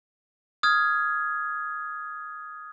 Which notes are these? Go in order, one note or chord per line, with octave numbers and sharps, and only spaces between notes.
D#6 F6 G#6